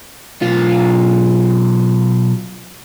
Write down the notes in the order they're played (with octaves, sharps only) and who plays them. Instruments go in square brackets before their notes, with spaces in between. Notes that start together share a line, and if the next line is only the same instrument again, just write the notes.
[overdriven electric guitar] B1 F4